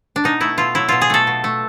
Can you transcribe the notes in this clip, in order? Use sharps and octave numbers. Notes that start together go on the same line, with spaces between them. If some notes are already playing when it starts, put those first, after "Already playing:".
D4
B2 D#4
A3 E4
B2 F4
F#3 E4
B2 F4
G#4
A3 A4
B2
A3